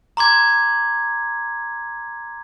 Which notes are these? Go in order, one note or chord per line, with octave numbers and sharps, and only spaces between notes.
A#5 C6 D6 G#6